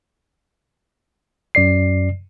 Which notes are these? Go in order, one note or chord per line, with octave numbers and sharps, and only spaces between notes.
F#2 D5 C7